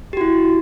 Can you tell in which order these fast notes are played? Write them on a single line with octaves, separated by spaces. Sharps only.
G4 F#4 E4